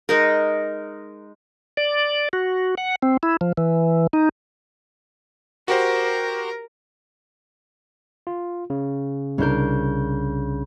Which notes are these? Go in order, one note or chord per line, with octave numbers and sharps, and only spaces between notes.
G#3 D#4 A#4
D5
F#4
F#5
C4
E4
F3
E3
D#4
F#4 G4 A#4 C5
F4
C#3
C2 C#3 D4 A#4 G6